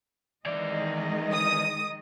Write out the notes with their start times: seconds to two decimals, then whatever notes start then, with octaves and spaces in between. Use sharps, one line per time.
0.46 D#3 E3 G#3 D5 D#5
1.33 D#6